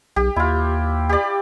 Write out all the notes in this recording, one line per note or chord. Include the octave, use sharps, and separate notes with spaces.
B1 G4
D#2 E4 F4
G4 D5